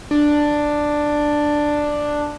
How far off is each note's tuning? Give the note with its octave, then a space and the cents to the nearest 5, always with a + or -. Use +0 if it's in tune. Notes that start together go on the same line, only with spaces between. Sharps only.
D4 +5